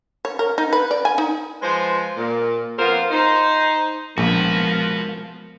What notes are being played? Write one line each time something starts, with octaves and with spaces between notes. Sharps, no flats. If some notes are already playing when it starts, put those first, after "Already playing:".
C#5
A#4
D#4
B4
D5
G#5
D#4
F3 G#3 B4 C5
A#2
F2 A#3 B3 F4 A#4 C5
D#4 C5
A#1 F3 G#3 B3 F#4 A#4 B4